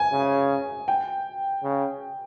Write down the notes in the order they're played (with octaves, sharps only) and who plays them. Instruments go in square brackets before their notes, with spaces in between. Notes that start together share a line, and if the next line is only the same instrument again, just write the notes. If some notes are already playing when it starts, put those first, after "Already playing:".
Already playing: [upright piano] G#5
[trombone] C#3
[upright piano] G5
[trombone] C#3